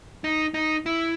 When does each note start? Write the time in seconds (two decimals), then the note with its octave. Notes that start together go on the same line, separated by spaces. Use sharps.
0.24 D#4
0.54 D#4
0.86 E4